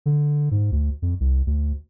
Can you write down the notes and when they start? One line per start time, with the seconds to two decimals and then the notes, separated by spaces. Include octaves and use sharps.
0.06 D3
0.51 G#2
0.72 D2
1.02 F2
1.20 C2
1.47 D2